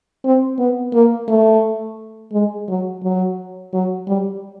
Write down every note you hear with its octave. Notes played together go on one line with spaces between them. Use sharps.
C4
B3
A#3
A3
G#3
F#3
F#3
F#3
G3